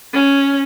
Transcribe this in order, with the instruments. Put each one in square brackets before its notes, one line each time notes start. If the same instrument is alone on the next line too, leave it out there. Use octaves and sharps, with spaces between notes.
[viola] C#4